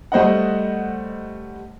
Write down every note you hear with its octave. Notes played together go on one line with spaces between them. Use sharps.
G3 A3 C5 D#5 F#5